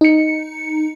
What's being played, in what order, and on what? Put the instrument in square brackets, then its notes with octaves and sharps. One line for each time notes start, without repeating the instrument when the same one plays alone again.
[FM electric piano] D#4 C#7